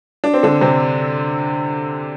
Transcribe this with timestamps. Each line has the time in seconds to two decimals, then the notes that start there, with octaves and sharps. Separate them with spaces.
0.24 D4
0.34 C4
0.43 D3 D4
0.61 C3 C4